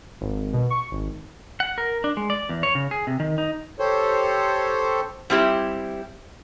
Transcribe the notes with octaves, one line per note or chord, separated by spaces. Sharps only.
G#1
B2
C#6
G#1
F#5
A#4
D4
G#3
D5
E2
C#5
C#3
G#4
C3
D#3
D#4
G4 A4 C5 C#5
G3 C4 E4 G4